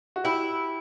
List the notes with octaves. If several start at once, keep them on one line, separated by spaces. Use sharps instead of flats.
F#4
E4 G4